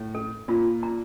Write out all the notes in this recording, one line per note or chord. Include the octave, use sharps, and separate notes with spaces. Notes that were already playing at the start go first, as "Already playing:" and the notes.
Already playing: A2
A4
A#2 F4
A#5